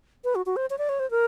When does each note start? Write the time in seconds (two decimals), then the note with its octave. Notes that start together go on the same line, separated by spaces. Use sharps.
0.24 B4
0.35 F#4
0.46 F#4
0.56 C5
0.70 C#5
0.78 D5
0.89 C#5
1.00 C5
1.11 A#4